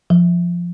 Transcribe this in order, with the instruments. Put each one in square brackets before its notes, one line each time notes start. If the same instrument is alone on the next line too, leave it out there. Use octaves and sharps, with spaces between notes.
[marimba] F3